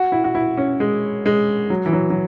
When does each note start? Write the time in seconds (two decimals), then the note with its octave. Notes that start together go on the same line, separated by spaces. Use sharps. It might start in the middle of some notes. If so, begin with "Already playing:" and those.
Already playing: F#4
0.12 E4
0.24 F#4
0.35 E4
0.58 C#4
0.80 G#3
1.26 G#3
1.70 F#3
1.86 E3
1.93 F#3
2.10 F#3